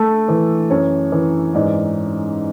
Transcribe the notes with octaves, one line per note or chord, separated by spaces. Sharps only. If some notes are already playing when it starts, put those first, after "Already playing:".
Already playing: A3 A4
E3
F#2 C#5
E3
G#2 D5